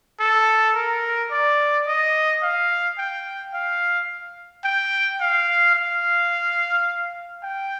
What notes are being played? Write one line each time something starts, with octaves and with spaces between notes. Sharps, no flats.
A4
A#4
D5
D#5
F5
G5
F5
G5
F5
F5
G5